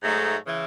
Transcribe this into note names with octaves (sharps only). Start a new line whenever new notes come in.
G#2 F#3 A3 D#4
C#3 E3